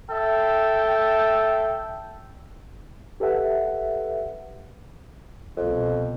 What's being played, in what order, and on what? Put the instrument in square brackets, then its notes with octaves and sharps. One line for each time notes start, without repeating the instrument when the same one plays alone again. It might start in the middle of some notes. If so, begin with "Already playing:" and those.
[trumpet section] A4 E5 G5
[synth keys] G4 A4 B4 E5 F#5
[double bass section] C2 B2 [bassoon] F2